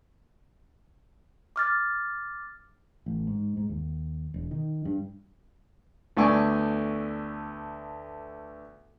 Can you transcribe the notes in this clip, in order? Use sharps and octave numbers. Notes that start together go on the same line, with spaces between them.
D6 F6 A6
A1
G#2
G#2
D#2
E1
D#3
G2
D2 A3 B3 D5 G#5 C#6